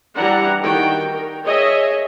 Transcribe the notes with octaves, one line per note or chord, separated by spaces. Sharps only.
E3 G3 D4 E4 F#5 A#5
D#3 F#4 G5
A#4
G#4 C#5 D#5 E5